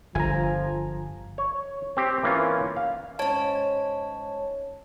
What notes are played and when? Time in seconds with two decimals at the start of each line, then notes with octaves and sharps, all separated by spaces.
0.15 G1 F3 G#5 A#5
1.38 C#5
1.97 C4 G4
2.23 E3 A#3 C#4 F4
2.77 F5
3.19 G#2 C#4 C#5 A5